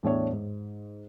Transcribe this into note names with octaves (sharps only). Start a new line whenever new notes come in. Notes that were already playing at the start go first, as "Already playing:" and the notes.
E2 A2 D4 C#5
G#2